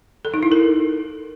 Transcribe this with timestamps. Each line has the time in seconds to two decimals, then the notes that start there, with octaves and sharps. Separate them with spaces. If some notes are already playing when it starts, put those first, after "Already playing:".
0.25 A4
0.34 D#4
0.43 E4
0.52 A#4